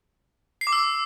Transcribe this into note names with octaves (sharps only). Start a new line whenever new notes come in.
C7
D6
E6